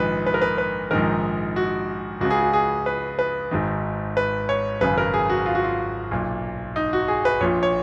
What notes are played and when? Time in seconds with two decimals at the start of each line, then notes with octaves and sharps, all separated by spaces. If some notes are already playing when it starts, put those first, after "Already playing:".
Already playing: A#1 G#2 D#3 B4
0.26 B4
0.34 A#4
0.42 B4
0.58 B4
0.91 A#1 G#2 D#3 A#4
1.56 F#4
2.21 C#2 C#3 F#4
2.31 G#4
2.41 F#4
2.53 G#4
2.86 B4
3.19 B4
3.51 G#1 G#2 D#3
4.17 B4
4.49 C#5
4.81 G#1 F#2 C#3 B4
4.98 A#4
5.14 G#4
5.29 F#4
5.46 F4
5.55 F#4
5.64 F4
6.11 B1 A#2
6.76 D#4
6.93 F#4
7.08 G#4
7.25 B4
7.41 A#1 A#2 C#5
7.63 C#5